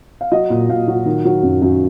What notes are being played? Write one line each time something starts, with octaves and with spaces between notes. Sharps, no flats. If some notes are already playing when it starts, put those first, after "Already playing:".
F5
F#3 D#5
A#2
A#2 F5
F#3
D#3
F#3
F#2
F#2